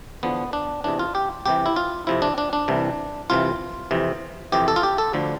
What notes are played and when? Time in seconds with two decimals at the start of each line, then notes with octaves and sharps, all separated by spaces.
0.23 E2 D3 F3 B3
0.53 D4
0.84 E2 C3 E3 D4
0.99 F4
1.15 G4
1.46 C2 C3 E3 G4
1.66 E4
1.76 F4
2.07 F2 C3 F3 E4
2.22 D4
2.38 D4
2.53 D4
2.68 C2 C3 E3
3.30 C2 C3 E3 F4
3.91 F2 C3 E3
4.52 F2 C3 E3 G4
4.68 A4
4.76 F4
4.83 G4
4.98 A4
5.13 D2 D3 F3